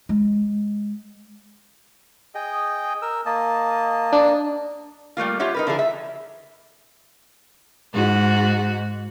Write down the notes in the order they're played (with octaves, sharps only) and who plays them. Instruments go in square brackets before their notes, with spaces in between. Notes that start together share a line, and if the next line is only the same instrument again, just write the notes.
[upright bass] G#3
[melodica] G#4 D#5 G5
A#4 E6
A#3 D#5 A5
[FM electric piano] D4
[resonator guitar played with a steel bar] G3 A3 A#3 F4
F4 G4 C#5 E5 F#5
D#4 A#4 B4
D3 F3 D4 E4 G#4 A#4
E5
[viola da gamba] G#2 F#4